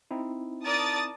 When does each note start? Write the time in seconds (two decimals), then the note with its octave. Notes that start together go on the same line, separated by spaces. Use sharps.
0.11 C4 D#4 E4
0.64 A#4 D5 A5 D#6 A6